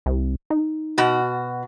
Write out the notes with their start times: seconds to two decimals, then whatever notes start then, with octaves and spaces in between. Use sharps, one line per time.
0.06 C2
0.50 D#4
0.98 B2 F#4